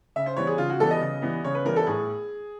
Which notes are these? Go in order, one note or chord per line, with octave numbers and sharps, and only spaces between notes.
C#3 E5
C5
E3 G3 B3 C#5
G#4
C#3 F4
F#4
E3 G3 B3 A4
D#5
C#3
E3 G3 B3
C#3 C#5
B4
E3 G3 B3 A#4
A4
A2 G#4